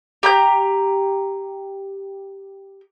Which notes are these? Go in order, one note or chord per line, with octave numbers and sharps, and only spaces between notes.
G4 A#5 G6